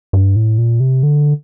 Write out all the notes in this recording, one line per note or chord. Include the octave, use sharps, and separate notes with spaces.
G2
A2
A#2
C3
D3